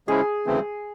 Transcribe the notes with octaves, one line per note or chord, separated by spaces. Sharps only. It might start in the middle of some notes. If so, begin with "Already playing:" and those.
C#3 F3 G#3 C#4 E4 G#4
D2 C#3 E3 A3 C4